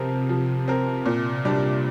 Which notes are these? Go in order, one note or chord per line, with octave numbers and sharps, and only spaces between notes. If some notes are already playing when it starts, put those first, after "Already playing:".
Already playing: C3 F3 C4 A#4
F3
C4 A#4
A#2
G3 D4